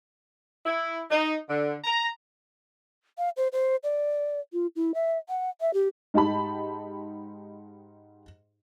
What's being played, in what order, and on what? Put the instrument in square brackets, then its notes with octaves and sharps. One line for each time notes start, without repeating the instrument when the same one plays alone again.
[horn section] E4
D#4
D3
A#5
[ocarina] F5
C5
C5
D5
F4
E4
E5
F#5
E5
G4
[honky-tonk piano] G#2 D#4 G4 A5 B5